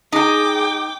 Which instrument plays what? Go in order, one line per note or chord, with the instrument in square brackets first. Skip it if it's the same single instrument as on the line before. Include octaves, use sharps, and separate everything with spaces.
[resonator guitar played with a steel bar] D#4 G#5 [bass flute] G#4 [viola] G5 D6